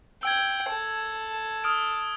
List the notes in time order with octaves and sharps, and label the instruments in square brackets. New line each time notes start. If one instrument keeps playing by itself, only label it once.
[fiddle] G5 [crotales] E6 G#6
[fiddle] A4
[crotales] D#6 F6 D7